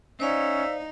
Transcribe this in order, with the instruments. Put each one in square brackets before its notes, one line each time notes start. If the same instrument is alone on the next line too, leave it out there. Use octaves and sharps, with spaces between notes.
[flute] C#4 [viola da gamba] D#4 [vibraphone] C5 D5 F5 [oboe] E5